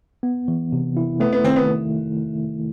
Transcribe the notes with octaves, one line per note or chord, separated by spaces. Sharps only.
B3
E3
C3
E4
A3 B3
B3
D#3 C4
B3